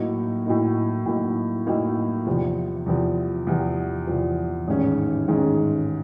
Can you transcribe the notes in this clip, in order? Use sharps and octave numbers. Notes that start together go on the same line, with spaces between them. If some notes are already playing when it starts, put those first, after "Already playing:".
Already playing: A2 F#3 A#3 D#4
A2 F#3 A#3 D#4
A2 F#3 A#3 D#4
A2 F#3 A#3 D#4
E2 C3 F3
E2 C3 F3
E2 C3 F3
E2 C3 F3
A1 G#2 D#3 G#3 C#4
A1 G#2 D#3 G#3 C#4